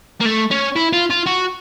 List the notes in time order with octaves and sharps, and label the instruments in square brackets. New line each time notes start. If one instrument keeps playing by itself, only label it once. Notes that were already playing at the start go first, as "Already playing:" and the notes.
[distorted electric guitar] A#3
A3
C#4
E4
F4
F4
F#4